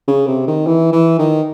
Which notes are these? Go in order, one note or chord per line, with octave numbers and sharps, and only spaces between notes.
C#3
C3
D#3
E3
E3
D#3